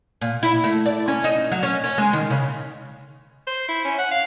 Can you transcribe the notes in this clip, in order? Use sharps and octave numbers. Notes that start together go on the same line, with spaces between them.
A#2
E4
A3
D5
C#4
D#4
F#3
C#4
C#4
G#3
D#3
C#3
C5
E4
C#4
F#5
F5